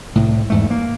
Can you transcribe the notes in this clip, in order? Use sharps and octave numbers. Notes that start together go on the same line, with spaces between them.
C2 A2
E2 G#2 A3
A#3